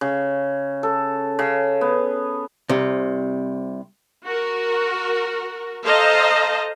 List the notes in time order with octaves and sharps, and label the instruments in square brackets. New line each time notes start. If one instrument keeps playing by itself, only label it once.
[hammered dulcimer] C#3
A4
C#3
B3
[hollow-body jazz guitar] C2 C3
[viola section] F#4 A#4
A4 C5 D#5 F5 A5 A#5